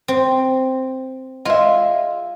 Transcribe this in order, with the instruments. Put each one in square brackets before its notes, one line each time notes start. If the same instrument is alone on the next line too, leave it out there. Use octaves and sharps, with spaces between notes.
[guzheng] C4
[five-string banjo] G#3 E5 [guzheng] F4